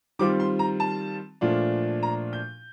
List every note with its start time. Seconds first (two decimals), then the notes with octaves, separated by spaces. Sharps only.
0.19 D#3 G3 C4 F4 D6
0.40 C6
0.59 A#5
0.80 A5
1.41 A#2 F3 A3 D4 F4
2.03 A#5
2.33 G6